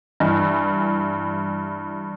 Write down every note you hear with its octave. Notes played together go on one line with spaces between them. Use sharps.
G2 E3